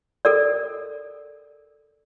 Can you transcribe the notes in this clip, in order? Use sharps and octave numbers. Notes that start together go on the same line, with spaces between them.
A4 A#4 D5